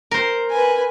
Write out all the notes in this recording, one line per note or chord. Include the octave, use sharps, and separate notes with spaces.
A#4 C5
B4 G#5